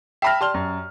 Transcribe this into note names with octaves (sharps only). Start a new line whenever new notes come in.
E5 G5 A5 B5 F6 A#6
G4 D5 A5 C6 F6 G7
F#2